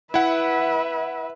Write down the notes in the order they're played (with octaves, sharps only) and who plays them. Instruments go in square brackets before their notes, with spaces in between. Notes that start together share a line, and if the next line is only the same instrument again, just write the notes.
[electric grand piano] E4 F#5 [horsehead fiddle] B4 E5